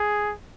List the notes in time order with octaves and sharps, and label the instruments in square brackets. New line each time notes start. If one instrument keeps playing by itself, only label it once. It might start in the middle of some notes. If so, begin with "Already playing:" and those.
Already playing: [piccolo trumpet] G#4